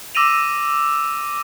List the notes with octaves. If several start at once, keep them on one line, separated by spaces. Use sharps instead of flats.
D6 E6 A#6 D#7 F7